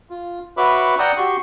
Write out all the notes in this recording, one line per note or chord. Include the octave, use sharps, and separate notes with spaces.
F4
F#4 B4 C#5 E5 B5 D6
D5 F#5 G5 A#5 D#6 E6
F#4 G4 C6 C#6